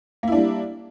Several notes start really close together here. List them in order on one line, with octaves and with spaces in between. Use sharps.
A#3 E4 D4 G3